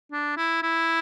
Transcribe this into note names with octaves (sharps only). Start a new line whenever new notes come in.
D4
E4
E4